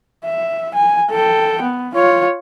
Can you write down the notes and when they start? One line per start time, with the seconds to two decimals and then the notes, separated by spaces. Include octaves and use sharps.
0.24 E5
0.74 G#5
1.11 A4 G5
1.61 B3
1.94 F4 C#5